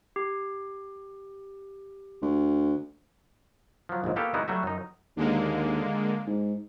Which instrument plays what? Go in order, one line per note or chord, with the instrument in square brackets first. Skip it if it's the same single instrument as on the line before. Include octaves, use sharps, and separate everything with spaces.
[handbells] G4
[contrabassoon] D2
[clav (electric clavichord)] F3 F#3
A#1 D#2 G#2
A#3 B3 G4 A4 C#5 F5
G3 G#3 B3 D#4 E4 F#4
F#3 G3 A3 F#4 E5
F#2 D#4
[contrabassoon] D#2 [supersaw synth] D3 G#3 A#3
[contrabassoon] G#2